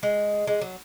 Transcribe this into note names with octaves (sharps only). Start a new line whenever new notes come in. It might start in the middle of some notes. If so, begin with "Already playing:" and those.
G#3
G#3
F#3